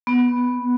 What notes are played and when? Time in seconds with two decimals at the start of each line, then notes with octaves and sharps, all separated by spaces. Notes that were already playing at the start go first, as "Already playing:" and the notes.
0.07 B3